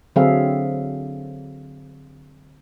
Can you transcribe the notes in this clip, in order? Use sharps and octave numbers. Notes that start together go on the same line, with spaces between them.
D3 F#3 C4 G#4 E5 F5